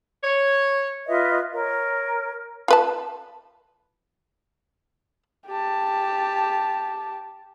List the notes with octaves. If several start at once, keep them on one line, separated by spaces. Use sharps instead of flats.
C#5
F4 B4 D#5 E5
A#4 C#5
F4 B4 A5
G4 A5